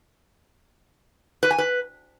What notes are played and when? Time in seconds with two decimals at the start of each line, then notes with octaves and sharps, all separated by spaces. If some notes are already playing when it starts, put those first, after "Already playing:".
1.43 B4
1.51 G#5
1.58 B4